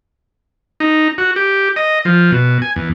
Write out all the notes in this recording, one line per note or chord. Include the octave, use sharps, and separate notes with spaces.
D#4
F#4
G4
D#5
F3
B2
G#5
E2